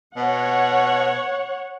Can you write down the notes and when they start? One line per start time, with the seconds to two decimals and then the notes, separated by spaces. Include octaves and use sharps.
0.16 B2 C#5 F#5